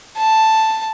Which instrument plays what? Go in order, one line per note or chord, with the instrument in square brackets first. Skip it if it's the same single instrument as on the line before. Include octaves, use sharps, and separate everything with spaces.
[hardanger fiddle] A5